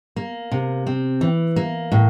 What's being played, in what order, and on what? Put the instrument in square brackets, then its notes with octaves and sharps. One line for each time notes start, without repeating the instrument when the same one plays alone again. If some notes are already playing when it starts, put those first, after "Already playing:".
[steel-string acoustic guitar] A#3
C3
C4
E3
A#3
A2